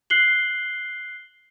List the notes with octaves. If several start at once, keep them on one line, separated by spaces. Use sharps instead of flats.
F#6 C7 F#7 G7